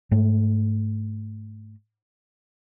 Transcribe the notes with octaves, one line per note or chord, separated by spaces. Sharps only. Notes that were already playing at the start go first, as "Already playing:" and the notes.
G#2 A3